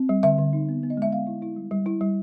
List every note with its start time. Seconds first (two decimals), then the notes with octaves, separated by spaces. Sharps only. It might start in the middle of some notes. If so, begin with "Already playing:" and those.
Already playing: C4
0.09 G3
0.23 D3 E5
0.38 D3
0.53 D#4
0.69 B3
0.83 B3
0.90 D#5
0.97 G#3 E5
1.12 B3 F5
1.27 E4
1.42 E4
1.56 G3
1.71 G3
1.86 E4
2.01 G3